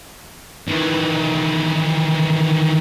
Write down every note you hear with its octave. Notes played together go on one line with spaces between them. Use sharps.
D#3 E3